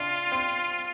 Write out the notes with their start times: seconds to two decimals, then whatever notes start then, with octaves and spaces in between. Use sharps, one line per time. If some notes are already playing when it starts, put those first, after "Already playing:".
Already playing: C3 D4 F4
0.32 C4